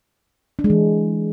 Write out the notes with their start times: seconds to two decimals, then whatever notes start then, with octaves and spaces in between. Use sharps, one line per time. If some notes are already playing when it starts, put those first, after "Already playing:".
0.59 D4
0.64 G#3
0.70 E3